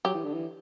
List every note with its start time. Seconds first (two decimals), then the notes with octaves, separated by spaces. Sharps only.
0.05 F#3 G4
0.15 E3
0.25 D3
0.34 E3